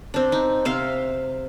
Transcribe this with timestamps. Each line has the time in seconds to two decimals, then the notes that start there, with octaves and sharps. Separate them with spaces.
0.14 C4 D4
0.32 D#4
0.65 C3 E5 F5 C6